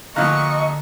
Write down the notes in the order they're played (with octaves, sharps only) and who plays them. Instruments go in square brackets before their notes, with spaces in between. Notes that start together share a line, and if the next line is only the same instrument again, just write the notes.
[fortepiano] A#1 A#2 A#5 [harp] D3 F5 F#6 [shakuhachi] D#5 [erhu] C#6